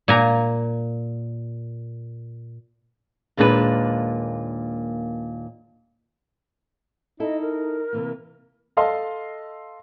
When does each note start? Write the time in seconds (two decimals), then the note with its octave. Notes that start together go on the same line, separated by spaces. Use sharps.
0.08 A#2 G#5 A#5
3.37 D#2 A#2 G#3 D4 G4 B4
7.20 D#4 E4 A4 D#5
7.40 A#4
7.93 C3 E3 A#3
8.77 A4 D#5 F5 A5 C6